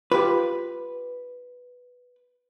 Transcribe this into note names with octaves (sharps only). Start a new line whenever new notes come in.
F4 G4 B4